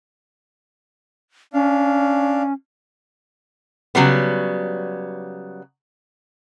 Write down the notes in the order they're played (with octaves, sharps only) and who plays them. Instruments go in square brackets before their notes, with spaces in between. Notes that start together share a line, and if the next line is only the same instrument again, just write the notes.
[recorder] C#4 [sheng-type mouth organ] D4 F5
[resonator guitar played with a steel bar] C#3 F#3 G3 B3